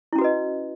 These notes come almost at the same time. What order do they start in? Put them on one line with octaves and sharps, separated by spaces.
E4 C#4 F#4 B4 D#5